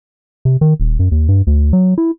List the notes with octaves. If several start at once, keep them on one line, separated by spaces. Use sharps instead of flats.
C3
D#3
D#1
F#2
D#2
G2
D2
F#3
E4